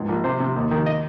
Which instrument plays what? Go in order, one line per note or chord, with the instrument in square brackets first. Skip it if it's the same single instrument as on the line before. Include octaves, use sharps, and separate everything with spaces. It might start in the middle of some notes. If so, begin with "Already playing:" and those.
Already playing: [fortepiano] C#2 G#2
A#1
C3 C5
C3
D#2
D#3
D#5